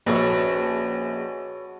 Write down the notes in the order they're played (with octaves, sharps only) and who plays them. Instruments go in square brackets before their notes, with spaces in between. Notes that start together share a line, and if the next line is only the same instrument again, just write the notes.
[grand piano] A#1 [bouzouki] C#4 G#4 B4 [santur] F#4 A4 D#5